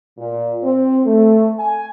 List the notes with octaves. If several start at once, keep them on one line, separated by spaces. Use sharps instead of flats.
A#2
C4
A3
G#5